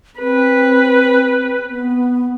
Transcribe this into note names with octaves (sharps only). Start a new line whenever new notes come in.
C4 B4
B3